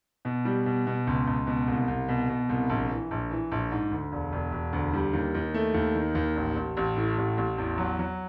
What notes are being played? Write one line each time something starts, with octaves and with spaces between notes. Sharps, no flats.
B2
G3
B2
B2
C#2
C#2
B2
C2
C2
B2
B2
C2
A#1
E3
A#1
E3
A#1
G#2
D2
E1
E1
E1
D2
G3
D#2
D#2
A3
D#2
D#3
D#2
A1
A1
A1
A2
A1
A1
E2
F#3
F#3